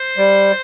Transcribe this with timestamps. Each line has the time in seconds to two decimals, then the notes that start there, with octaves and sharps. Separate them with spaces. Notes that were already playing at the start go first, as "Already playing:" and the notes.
Already playing: C5
0.18 G3